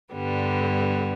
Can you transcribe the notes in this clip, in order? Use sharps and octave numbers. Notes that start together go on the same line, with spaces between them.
G2 D3 G3 B3